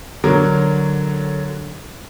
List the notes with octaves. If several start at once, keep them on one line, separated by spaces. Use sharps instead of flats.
D3 F#3 A#4 C#5